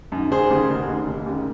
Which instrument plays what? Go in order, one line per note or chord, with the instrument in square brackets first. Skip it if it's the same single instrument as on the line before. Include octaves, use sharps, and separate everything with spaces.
[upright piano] F#2 D#3
F1 G#4 C5
D#2 C#3
F1
D#2 C#3
F1
D#2 C#3